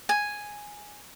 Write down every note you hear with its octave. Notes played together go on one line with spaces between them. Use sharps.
G#5